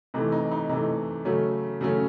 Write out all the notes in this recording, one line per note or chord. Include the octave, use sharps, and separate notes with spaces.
C3 E3 A3 D#4
D#4
D#4
C3 E3 A3 D#4
C#3 F#3 A3 C#4
C#3 F#3 A3 C#4